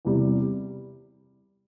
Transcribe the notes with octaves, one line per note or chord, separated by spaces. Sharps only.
E2 C3 G3